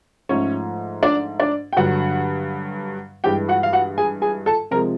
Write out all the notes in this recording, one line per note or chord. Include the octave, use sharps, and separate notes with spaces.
G#2 F3 A3 C#4 C#5
D4 D5
D4 D5
G5
G2 D3 F#3 F#4 F#5
G2 E3 G#3 G4 G5
F#4 F#5
F5
F#4 F#5
G#4 G#5
G#4 G#5
A4 A5
C3 F3 G#3 A#4 A#5